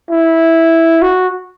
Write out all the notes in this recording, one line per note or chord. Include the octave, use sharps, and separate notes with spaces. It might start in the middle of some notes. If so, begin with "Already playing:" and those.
E4
F#4